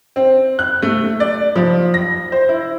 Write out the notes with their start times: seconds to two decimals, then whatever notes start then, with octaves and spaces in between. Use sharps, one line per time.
0.16 C4
0.59 F#6
0.82 A3
1.20 D5
1.56 F3
1.94 A#6
2.32 C5
2.49 E4